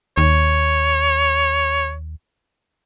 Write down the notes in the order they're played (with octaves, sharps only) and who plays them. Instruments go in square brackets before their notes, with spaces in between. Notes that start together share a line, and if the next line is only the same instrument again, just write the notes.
[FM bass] D#2 [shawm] C#5